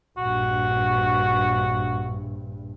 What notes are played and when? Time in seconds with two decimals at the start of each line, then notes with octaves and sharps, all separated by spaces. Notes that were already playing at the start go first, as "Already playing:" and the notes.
0.17 A#1 G2 F#4